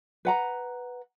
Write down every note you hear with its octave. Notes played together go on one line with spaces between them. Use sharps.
B4 F#5 A#5